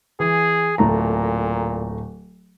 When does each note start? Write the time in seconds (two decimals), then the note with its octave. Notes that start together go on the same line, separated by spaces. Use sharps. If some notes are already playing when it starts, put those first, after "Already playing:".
0.20 E3 G#4
0.78 D1 A#2 A3 A#5